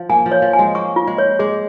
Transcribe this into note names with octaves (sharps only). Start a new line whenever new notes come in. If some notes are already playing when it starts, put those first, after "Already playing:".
Already playing: F3
A#3 G#5
F3
C#5
F3
G#5
G#3
A#3 C#6
F4
G#3
C#5
G#3 G#4